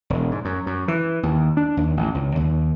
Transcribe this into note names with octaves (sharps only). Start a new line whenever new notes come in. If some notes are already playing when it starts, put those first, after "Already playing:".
E1
G#2
F#2
F#2
E3
D#2
D4
D#2
A1
C#2
D#2